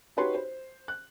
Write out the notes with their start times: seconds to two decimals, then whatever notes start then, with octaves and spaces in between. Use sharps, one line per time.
0.17 D#4 F#4 G4 B4 C#5 C6
0.35 C5
0.88 F#6